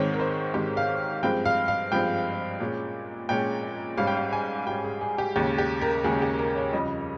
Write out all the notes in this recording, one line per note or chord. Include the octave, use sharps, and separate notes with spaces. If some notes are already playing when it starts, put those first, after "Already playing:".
Already playing: G#2 D#3 G#3 C4 C#5
A#4
C5
G#2 D#3 G#3 C4 G4
F5
G2 F3 G#3 C4 G5
F5
F5
G2 F3 G#3 C4 G5
A#2 G#3 C#4
A#2 G#3 C#4 G5
G#2 G3 C#4 F5
G5
F5
G#5
G#2 G3 C#4 G5
G#4
G#4
G4
D#2 C#3 G#3 C#4 G4
G4
A#4
D#2 C#3 G#3 C#4 G#4
G4
A#4
C#5
F2 C#3 G3 D#5